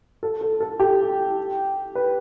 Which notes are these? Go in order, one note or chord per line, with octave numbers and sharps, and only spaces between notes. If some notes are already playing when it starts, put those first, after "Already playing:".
A4
A4
A4
G4
B4